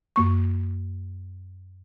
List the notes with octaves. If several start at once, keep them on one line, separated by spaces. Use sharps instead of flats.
F#2 A#3 C#6